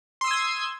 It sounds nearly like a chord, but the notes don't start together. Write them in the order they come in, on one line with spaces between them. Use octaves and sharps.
C6 E6 D#6 G#6